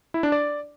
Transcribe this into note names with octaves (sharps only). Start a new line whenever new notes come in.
E4
D4
D5